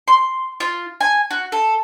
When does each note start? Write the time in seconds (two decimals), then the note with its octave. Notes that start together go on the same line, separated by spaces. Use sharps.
0.08 C6
0.60 F4
1.00 G#5
1.31 F#4
1.52 A4